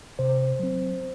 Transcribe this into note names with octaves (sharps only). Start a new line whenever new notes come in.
C3 C5
F#3 C4